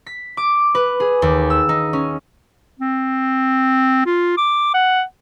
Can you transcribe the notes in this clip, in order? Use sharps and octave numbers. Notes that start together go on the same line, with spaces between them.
B6
D6
B4
G#4
D#2
E6
D#4
C#4
C4
F4
D6
F#5